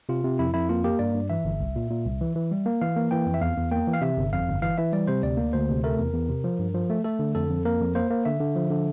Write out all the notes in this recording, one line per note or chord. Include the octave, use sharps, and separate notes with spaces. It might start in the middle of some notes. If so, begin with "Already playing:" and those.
C3 F4
C3
F2 E4
F2 E4
A#3 F4
A#3 G4
G2 D5
G2
E3 E5
G1
C2
A#2
A#2
C2
E3
E3
G3
A#3
E3 F5
A#3
E3 G5
F2
E5
E2 F5
E2
A#3 G5
E3
F5
C3 E5
G1
F2 F5
G1
E3 F5
E3 E5
G3 D5
C3 C5
D2 D5
A#3
D2 C5
C3
A3 A#4
E2
E2
C3
F3
G2
F3
A3
A3 A4
D3
F2 A4
F2
A#3 A#4
F2
A#3 C5
A#3
D3 E5
D3
F3
D3